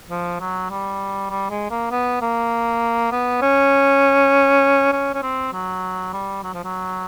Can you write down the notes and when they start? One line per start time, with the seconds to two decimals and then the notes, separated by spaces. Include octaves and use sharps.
0.10 F3
0.40 F#3
0.70 G3
1.30 G3
1.50 G#3
1.71 A#3
1.91 B3
2.22 A#3
3.12 B3
3.42 C#4
4.92 C#4
5.14 C#4
5.23 C4
5.53 F#3
6.13 G3
6.44 F#3
6.54 F3
6.64 F#3